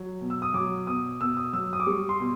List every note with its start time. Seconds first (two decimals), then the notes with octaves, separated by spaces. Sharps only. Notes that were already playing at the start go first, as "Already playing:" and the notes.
Already playing: F#3
0.21 B2
0.30 E6
0.42 D#6
0.54 F#3 D6
0.87 B2 D#6
1.21 B2 E6
1.37 D#6
1.53 F#3 E6
1.73 D#6
1.80 D6
1.87 G3 C#6
2.09 C6
2.20 B2